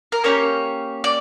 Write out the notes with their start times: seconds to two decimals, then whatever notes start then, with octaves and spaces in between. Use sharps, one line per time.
0.12 A#4
0.24 A#3 C#4 G4 C#5
1.04 D5